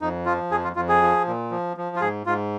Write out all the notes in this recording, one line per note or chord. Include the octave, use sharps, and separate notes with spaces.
F2 D#4
F3 F4
F2 G#4
F4
F2 F4
G#4
F3
A#2
F3
F3
F4
G#2 G#4
G#2 F4